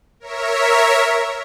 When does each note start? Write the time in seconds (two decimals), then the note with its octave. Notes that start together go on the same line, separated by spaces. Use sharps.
0.20 A#4 C#5 E5